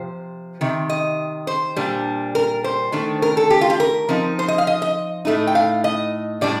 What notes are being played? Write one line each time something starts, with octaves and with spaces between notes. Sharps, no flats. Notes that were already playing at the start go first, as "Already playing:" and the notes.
Already playing: C3 F3 C5
C3 D#3
D#5
C5
A#2 G3 D4
A#4
C5
D#3 A3 D4
A#4
A4
G4
F4
G4
A#4
F3 C4 D#4
C5
D#5
F5
D#5
D#5
A2 A3 D#4
G5
F5
D#5
A2 G3 D4 D5